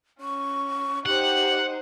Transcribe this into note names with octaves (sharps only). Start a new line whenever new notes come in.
C#4 C#6
D#4 G4 C5 F#5